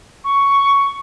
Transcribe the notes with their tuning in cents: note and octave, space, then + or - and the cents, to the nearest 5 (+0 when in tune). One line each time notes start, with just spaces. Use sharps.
C#6 +10